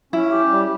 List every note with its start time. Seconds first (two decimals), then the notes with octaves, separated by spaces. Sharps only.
0.13 C#4 E4
0.31 G4
0.49 G3